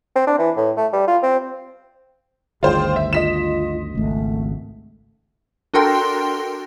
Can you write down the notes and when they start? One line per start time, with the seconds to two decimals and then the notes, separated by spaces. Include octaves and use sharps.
0.16 C4
0.27 D4
0.39 E3
0.57 A2
0.77 A3
0.93 G3
1.08 F4
1.23 C4
2.63 G1 D2 D#3 F4 G#4 C5 G5
2.96 C5 E5
3.13 F4 D#5 B6 E7
3.95 G#1 C#2 A3
5.74 D4 F#4 A4 A#4 G5 C6